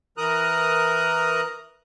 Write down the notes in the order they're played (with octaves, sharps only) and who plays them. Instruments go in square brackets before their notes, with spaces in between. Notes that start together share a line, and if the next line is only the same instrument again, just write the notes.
[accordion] E3 A#4 A#5 D#6 F#6